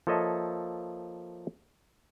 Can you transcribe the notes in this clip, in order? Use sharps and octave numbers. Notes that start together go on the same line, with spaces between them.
F3 A#3 A4 C#5 D#5 E5